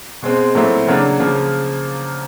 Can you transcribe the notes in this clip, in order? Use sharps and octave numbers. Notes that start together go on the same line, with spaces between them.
B2 G#3 C4
A#2 F#3 A3 C4 E4
C#3 F#3 A#3 D4
C#3 F3 A#3